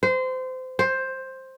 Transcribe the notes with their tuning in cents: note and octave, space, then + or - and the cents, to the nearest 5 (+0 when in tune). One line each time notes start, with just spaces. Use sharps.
C5 -25
C5 +10